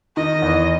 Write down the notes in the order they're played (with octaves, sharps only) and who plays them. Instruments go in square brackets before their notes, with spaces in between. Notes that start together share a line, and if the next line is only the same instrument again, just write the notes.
[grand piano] D#3 [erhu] D#5
[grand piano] E2